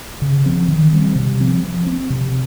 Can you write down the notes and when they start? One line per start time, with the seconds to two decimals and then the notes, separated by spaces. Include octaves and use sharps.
0.22 C#3
0.46 F3 C4
0.68 D#3
0.93 G3 C4
1.15 C3
1.40 F3 C4
1.64 F3
1.87 C4
2.10 C3